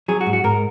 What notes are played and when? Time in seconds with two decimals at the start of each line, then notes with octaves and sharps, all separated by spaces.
0.08 F#3 G#4
0.21 F#4
0.26 G#2
0.33 F#4
0.44 G#2 A#4